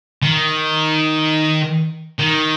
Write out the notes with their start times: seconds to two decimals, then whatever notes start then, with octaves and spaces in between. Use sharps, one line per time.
0.22 D#3
2.19 D#3